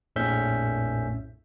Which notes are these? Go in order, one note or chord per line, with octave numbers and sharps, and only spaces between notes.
A#1 F2 A2 C#4 E5 G6